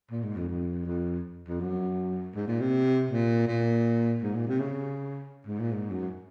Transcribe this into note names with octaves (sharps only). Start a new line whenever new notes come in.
A#2
G#2
F2
F2
F2
F2
F#2
G#2
A#2
C3
A#2
A#2
G#2
A#2
C3
C#3
G#2
A#2
G#2
F#2